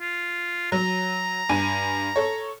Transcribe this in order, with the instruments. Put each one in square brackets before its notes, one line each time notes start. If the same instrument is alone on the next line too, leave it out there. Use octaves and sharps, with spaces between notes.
[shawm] F4
[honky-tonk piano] F#3 [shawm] A#5
[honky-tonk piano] G2 G#5 D#7
A4 C#5